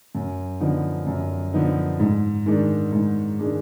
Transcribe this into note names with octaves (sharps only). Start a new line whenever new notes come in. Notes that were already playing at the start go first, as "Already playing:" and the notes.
F#2
D3 F3 B3 D#4
F#2
D3 F3 B3 D#4
G#2
D#3 G#3 D4
G#2
D#3 G#3 D4